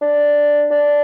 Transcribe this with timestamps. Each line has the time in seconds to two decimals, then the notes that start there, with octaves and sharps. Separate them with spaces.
0.02 D4
0.71 D4